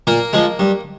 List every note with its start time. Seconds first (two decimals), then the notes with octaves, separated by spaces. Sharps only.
0.07 A#2 A#3 A#4
0.33 F3 G#3
0.59 G2